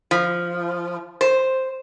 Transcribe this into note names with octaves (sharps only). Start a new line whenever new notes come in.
F3
C5